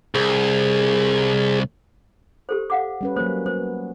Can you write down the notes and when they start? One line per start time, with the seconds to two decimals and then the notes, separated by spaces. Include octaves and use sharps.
0.15 C2 G#4
2.49 G4 A4 C5
2.70 F5 F#5 D6
3.01 G3 C#4 B4
3.16 F#3 A#3 C5
3.46 B3 C5